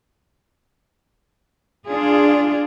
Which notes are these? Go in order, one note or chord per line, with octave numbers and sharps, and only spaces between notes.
D4 F4 G#4